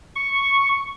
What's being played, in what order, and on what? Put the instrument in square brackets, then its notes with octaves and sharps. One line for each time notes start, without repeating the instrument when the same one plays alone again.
[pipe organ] C#6